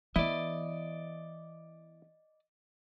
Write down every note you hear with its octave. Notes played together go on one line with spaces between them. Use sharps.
E3 B3 E4 D5 D#5